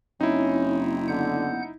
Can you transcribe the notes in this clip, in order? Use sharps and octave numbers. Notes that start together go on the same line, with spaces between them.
F#1 C4 C#4 D#4 E4
D3 B3 F#5 G6